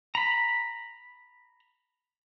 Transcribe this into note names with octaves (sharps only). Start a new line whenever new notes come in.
A#5 B5